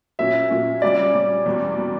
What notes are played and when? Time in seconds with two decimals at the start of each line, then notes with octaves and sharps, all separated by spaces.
0.19 A#2 F#3 C#4 E5
0.50 A#2 F#3 C#4
0.82 C#3 G3 C#4 G4 D5
1.14 C#3 G3 C#4 G4
1.46 E2 B2 G3
1.78 B2 G3